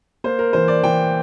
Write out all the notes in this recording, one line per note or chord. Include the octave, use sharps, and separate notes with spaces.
A#3 C5
A#4
E3 C5
D5
E3 G5